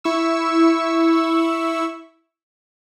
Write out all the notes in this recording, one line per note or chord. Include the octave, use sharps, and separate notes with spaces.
E4 C#6 E6